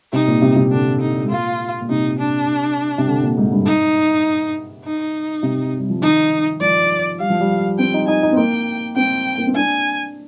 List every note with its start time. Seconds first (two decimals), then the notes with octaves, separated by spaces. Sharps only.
0.13 C3 D#4
0.27 A#2
0.42 C3
0.56 C3
0.71 D3 D4
1.01 D#4
1.23 G#2
1.30 A#2 F4
1.81 A#2
1.89 C3 D#4
2.19 D4
2.98 C3
3.07 D3
3.23 A#2
3.37 G#2
3.52 G2
3.66 D#4
4.85 D#4
5.43 C3
5.79 G3
5.90 F3
6.02 D#3 D#4
6.61 F3 D5
7.19 G3 F5
7.30 F3
7.41 G3
7.79 C4 G5
7.94 D#4
8.08 D#4 G#5
8.23 D#4
8.32 C4
8.37 A#3 G5
8.96 C4 G5
9.38 A#3
9.47 C4
9.55 D4 G#5